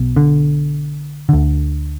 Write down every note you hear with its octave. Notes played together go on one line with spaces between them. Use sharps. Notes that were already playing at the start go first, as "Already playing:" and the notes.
Already playing: B1 B2
D3
D2 D3